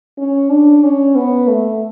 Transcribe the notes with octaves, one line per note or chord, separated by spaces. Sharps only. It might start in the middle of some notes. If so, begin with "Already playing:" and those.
C#4
D4
C#4
B3
A3